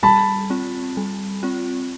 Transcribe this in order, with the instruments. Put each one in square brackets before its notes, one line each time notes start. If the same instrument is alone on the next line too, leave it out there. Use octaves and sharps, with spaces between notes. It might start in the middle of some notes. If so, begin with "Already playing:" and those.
[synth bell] G3 [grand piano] A5 B5
[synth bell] C4 F4
G3
C4 F4